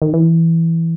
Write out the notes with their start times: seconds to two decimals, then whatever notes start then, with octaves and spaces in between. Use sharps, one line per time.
0.02 D#3
0.14 E3